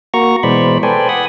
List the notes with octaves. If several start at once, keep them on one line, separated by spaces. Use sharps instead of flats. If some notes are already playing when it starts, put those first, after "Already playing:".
A#3 F#4 A#5 C#6
B2 E3 G#3 C5 D5 B5
A4 B4 C5 D5 G5 G#5
F#5 G#5 B5 D#6